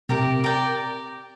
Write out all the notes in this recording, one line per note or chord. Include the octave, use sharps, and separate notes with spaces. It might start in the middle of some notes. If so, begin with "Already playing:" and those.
C3 G4 A#4 D5 G5
G4 A#4 D5 G5